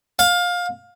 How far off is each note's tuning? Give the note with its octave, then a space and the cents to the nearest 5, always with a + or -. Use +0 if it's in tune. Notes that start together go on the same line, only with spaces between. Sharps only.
F5 +20